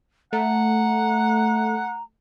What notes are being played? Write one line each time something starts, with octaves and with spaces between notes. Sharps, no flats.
A3 F#5 A#5